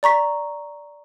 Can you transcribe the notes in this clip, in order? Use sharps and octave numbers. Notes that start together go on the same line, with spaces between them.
D5 A#5 C#6 B6